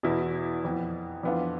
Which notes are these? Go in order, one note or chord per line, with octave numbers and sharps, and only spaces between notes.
E2 B2 B3 E4
F2 E3 B3
F2 E3 B3 D4 F4